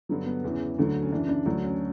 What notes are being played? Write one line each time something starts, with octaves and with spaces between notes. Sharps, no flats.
G2 D3 F#3 B3
B3
E2 C#3 E3 C#4
D2 D3 F#3
C#4
F#2 C#3 E3 D4
D4
D2 D3 F#3 D4
C#4